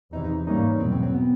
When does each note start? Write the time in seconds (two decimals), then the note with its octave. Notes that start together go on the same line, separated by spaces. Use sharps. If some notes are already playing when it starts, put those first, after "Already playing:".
0.12 E2 C3 E3 D#4
0.24 D#4
0.47 G#2 E3 G3 A#3 C#4 D#4
0.80 E2 B2 F#3 C4
0.92 C4
1.02 C4
1.14 B3